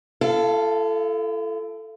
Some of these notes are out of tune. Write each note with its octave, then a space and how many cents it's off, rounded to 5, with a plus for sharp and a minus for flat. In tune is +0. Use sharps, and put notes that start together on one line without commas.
E4 +45 A4 +0 F5 +0